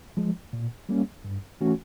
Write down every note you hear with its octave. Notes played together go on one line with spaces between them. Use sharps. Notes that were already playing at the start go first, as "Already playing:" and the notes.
F3 G#3
A#2
G3 A#3 C#4
G2
E3 A3 C#4 F#4